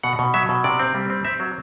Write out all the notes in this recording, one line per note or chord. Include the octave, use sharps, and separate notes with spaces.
B2 F#5
B2
F#3 E5
B2
C3 D5
C4
G3
C4
C4 E5
F#3